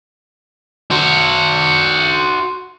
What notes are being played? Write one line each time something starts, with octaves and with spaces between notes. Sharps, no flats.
F#4 C5